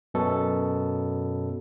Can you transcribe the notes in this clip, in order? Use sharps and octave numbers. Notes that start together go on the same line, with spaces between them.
F#2 B2 A4